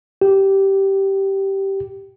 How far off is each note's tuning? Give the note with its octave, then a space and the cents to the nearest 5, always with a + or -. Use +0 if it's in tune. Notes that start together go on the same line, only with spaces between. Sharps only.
G4 -10